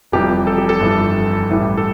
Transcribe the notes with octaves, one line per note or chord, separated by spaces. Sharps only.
F1 F2 E3 G3 G4
A4
G4
A4
G1 F2 E3 G3
A1 A2 E3 G3
A4